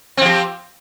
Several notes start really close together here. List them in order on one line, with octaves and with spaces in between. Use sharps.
C4 F3 G4